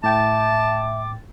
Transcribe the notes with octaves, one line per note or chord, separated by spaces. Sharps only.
A2 E5 G5 A5 D6 A6